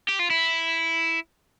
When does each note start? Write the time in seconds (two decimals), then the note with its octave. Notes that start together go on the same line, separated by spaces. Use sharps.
0.09 G4
0.19 F4
0.30 E4